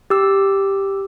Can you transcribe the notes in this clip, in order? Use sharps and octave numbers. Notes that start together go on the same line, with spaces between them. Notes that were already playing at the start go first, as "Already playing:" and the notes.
G4 E6